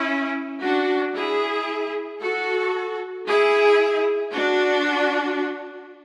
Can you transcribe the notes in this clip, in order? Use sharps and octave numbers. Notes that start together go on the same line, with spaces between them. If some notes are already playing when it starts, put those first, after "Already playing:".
Already playing: C#4 E4
D4 F#4
E4 G#4
F#4 A4
E4 G#4
D4 F#4